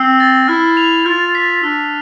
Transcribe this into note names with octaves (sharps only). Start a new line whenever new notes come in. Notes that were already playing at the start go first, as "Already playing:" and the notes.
Already playing: C4 E6 C7
A6
E4 F6
F7
F4 F6
B6
D4 E6